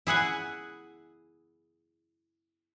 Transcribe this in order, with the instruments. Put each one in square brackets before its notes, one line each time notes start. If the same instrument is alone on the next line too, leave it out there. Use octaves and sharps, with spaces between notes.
[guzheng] E4 G#4 F#5 G#5